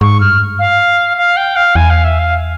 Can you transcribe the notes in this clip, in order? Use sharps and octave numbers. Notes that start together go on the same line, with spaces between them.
G#2 C#6
G2 F6
F5
F5
G5
F5
E2 G#5
F5
E5
F5